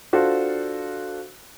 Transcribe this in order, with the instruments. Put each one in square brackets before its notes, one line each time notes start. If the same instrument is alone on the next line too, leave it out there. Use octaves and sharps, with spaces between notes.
[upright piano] D4 F4 F#4 A4 C5